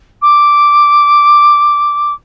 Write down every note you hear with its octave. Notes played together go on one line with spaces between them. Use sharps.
D6